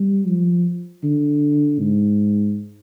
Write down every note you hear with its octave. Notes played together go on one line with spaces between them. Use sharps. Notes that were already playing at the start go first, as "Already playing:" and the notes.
Already playing: G3
F3
D3
G#2